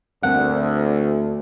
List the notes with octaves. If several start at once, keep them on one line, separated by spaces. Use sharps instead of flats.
D2 A3 A#3 C4 F#5 A5